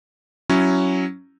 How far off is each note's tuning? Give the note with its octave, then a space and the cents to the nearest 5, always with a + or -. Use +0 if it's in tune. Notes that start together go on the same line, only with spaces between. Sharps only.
F#3 +0 C#4 +0 E4 +0